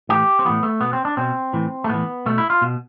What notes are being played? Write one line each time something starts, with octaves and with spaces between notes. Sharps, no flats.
A2 E3 G4
C4
A2 E3 B3
A3
B2 B3
C4
D4
B2 C4
A2 E3
A3
A2 E3 B3
B2 A3
E4
F4
B2